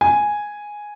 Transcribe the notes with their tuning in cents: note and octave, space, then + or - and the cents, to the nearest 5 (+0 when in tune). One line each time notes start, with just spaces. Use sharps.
G#5 +0